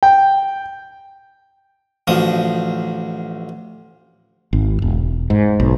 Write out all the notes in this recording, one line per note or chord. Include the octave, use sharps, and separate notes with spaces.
G5
A1 D2 F3 D#6
G#1
E1
G#2
B1